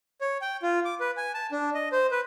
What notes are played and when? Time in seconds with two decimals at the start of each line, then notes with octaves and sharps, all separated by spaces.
0.21 C#5
0.41 G5
0.62 F4
0.85 D6
1.00 B4
1.17 G#5
1.34 A5
1.52 D4
1.74 D#5
1.92 C5
2.11 B4